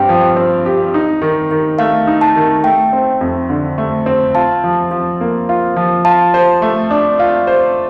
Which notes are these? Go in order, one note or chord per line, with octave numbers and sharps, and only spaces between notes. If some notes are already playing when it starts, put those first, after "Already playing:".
Already playing: G2 C4 G4 G5
F3
C4
G4
D#4
D#3
D#3
A3 F5
D#4
A5
D#3
A3 G5
C4
F2
D3
A3
C4
F4 A5
F3
F3
A#3
F4
F3
F4 A5
C5
A3
D4
F4
C5